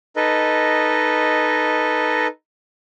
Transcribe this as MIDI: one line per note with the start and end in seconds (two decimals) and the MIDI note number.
0.16 2.27 63
0.16 2.27 69
0.16 2.27 71
0.16 2.27 75